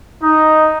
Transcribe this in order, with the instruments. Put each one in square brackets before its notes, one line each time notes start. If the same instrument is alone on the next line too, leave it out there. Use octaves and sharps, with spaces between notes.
[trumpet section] D#4